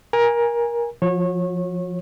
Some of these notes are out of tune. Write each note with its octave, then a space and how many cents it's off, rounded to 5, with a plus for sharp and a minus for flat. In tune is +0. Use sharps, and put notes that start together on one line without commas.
A#4 +20 G#5 -15
F3 +0 F#4 -35 C#5 -25